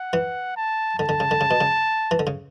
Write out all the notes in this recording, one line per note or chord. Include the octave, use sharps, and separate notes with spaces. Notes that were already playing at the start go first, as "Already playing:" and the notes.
Already playing: F#5
E3
A5
D3 A5
D3
C#3
D3
C#3
B2
C#3
E3
D3
C#3